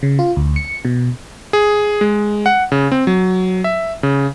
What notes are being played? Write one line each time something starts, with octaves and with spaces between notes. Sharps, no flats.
C#3
F4
D2
C#7
B2
G#4
G#3
F#5
C#3
C4
F#3
E5
C#3